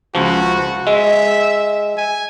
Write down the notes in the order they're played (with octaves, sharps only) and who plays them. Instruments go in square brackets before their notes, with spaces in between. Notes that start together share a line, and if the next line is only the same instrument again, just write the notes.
[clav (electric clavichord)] C#2 F3 [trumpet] F#4
[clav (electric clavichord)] G#3 [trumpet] E5
[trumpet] G#5